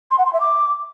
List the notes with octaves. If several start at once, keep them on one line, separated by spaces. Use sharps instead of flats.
C6
F#5
C6
E5
D6